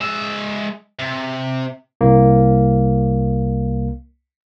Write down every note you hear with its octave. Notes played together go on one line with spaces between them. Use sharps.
G#3 E5
C3
C2 A#3